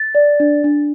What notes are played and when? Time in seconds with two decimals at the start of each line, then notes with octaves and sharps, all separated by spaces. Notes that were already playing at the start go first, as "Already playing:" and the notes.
Already playing: A6
0.15 D5
0.40 D4
0.64 D4